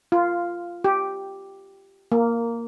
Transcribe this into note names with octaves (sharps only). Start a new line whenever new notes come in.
F4
G4
A#3